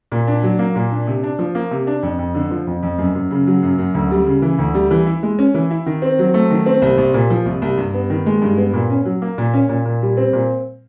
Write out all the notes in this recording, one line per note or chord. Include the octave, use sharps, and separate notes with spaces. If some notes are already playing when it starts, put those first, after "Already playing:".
A#2
D4
F#3
A#3
A#2
D4
C3
D4
F3
A#3
C3
D4
F2
F2
D3
F3
F2
F2
F#2
F#2
C#3
F#3
F#2
F#2
D2
G3
C#3
E3
D2
G3
E3
E4
G#3
C#4
E3
E4
D#3
C4
F#3
A3
D#3
C4
C2
C2
A#2
F3
C2
C2
G2
B3
D#3
G#3
G2
B3
A#2
C#4
F#3
A#3
A#2
C#4
A#2
A#2
G3
C4
A#2